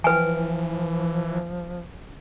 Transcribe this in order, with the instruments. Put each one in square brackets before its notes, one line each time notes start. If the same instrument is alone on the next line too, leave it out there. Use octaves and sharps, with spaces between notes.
[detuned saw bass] E3 [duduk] F3 [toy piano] B4 G5 G#5